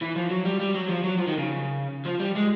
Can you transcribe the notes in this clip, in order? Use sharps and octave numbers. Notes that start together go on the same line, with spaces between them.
E3
F3
F#3
G3
G3
F#3
F3
F#3
F3
D#3
C#3
F3
G3
G#3